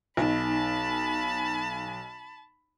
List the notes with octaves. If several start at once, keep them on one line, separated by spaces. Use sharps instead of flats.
B1 B3 D#4 A5 B5